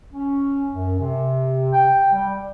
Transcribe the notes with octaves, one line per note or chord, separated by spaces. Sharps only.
C#4
F#2
C3
G5
G3